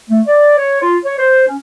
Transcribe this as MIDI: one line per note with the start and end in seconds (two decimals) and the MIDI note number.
0.10 0.21 57
0.27 0.57 74
0.57 0.78 73
0.82 0.97 65
1.05 1.15 73
1.18 1.47 72
1.48 1.57 61